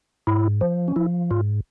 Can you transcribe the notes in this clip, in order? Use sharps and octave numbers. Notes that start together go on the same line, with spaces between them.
G#2 E4
F3
C#4
F3 E4
G#2 F4